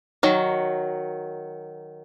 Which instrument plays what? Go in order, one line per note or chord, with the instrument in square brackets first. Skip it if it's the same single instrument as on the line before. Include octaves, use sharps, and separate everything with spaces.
[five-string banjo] D#3 F#3